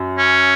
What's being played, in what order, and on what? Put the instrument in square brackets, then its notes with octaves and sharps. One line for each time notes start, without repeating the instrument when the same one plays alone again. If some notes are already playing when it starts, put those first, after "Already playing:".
Already playing: [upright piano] F#2
[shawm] C#4